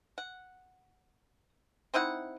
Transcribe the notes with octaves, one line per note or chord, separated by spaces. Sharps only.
F#5
C4 D#4 E4 F#5